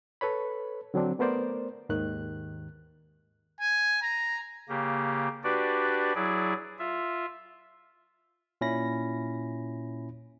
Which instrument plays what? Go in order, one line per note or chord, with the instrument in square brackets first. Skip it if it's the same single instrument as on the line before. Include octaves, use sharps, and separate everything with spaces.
[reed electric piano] A4 B4 C#5 B5
D3 F#3 C4 D4
A3 B3 A#4 C5 D5
D#2 G#2 D#3 F#6
[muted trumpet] G#5
A#5
[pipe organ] C#3 A#3 G4
D4 F#4 G4 B4 D5
F#3 E4 G#4 D5
F4 E5
[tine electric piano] A#2 C#4 E4 B5 A#6